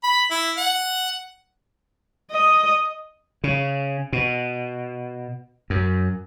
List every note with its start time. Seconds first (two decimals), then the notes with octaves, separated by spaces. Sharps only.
0.03 B5
0.31 E4
0.57 F#5
2.31 D#5
3.44 C#3
4.13 B2
5.70 F#2